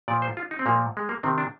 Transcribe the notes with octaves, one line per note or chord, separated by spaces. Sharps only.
A#2 F3 D5
C5
F4
D#4
C4
A#2 F3 A#3
G#3
A#3
C3 D#3 C4
D4